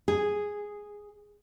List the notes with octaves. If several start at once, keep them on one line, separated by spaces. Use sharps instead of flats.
G#4